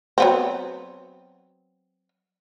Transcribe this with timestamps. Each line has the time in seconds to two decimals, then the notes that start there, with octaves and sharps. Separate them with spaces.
0.18 F#3 B3 C4